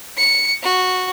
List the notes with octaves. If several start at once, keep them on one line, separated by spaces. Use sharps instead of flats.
C#7
F#4